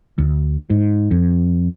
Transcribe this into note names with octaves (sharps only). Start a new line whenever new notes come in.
D2
G#2
F2